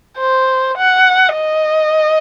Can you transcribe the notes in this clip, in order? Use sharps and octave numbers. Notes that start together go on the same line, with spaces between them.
C5
F#5
D#5